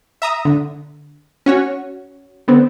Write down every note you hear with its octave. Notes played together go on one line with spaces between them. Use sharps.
E5 A#5 D#6
D3
C#4 F#4 C#5
D3 B3 C4